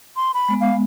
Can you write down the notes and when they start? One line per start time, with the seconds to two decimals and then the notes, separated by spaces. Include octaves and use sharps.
0.16 C6
0.34 B5
0.48 G#3 B3
0.61 F5